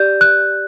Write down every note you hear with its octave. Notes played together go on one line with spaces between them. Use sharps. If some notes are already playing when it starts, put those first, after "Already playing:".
Already playing: G4 D5 G6
F#6